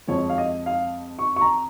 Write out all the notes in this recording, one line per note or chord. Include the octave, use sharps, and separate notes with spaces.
F2 F3 G#3 C#5
F5
D#5
F5
C#6
C#6
A#5